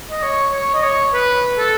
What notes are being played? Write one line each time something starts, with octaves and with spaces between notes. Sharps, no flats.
D#5
C#5
C#5
D#5
C#5
B4
A4